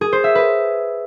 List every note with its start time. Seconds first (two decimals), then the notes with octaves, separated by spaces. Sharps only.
0.01 G#4
0.13 C5
0.24 E5
0.35 B4